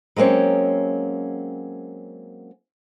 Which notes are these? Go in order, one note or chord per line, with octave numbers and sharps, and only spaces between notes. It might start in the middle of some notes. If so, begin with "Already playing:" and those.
F#3 G#3 A#3 C4 C#4